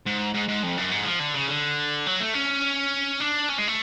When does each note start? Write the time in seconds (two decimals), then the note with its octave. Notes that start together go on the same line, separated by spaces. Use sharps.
0.06 G#2
0.34 G#2
0.48 G#2
0.63 F2
0.77 F#2
0.91 G#2
1.05 F3
1.20 D3
1.34 C#3
1.48 D3
2.06 F#3
2.20 A3
2.34 C#4
3.20 D4
3.49 C#4
3.58 G#3
3.68 A3